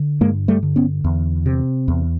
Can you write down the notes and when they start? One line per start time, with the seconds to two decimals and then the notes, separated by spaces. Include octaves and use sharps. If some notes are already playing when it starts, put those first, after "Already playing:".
Already playing: D3
0.21 G2 G#3 A#3
0.48 G3 A3
0.63 D3
0.76 B3 C#4
1.04 E2
1.46 C3
1.88 E2